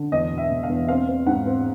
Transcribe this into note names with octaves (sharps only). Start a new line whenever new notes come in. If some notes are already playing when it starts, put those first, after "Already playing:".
Already playing: D3
E2 D#5
B2
E5
B2
F5
E2
C4 F5
C4
G#2 F#5
C4